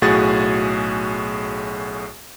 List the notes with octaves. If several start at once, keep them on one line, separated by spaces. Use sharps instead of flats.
B1 A2 F#4 G#4 A6